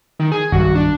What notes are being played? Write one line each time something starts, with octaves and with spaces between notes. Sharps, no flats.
D#3
G#4
B1 G2 D#3 F#4
D4